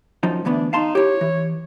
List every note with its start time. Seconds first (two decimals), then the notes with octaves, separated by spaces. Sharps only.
0.23 F#2 F3 D#4
0.45 D2 E3 B3 D4
0.73 D#4 F5 A5 C6
0.95 E4 G4 C#5
1.21 E3